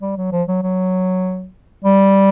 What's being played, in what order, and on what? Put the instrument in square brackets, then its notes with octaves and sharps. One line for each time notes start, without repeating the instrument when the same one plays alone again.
[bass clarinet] G3
F#3
F3
F#3
F#3
G3